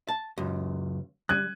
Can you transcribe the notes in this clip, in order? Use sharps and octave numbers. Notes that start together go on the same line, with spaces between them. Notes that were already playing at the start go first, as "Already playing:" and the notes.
A5
C#2 F#2
G3 F#6 G#6 D#7